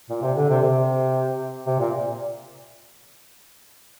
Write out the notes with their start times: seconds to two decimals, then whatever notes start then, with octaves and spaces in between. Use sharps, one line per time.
0.10 A#2
0.23 C3
0.37 D3
0.49 C3
0.62 C3
1.67 C3
1.80 A#2